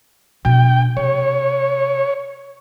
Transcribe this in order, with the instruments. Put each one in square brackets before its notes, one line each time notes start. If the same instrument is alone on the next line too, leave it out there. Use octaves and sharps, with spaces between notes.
[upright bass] B2 D4 [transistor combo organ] G5
[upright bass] C3 [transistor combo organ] C#5